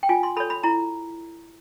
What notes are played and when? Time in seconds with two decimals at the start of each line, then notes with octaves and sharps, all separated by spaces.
0.03 G5
0.09 F4 G#5
0.23 C6
0.37 A4 C#5 B5
0.50 B5
0.63 E4 A#5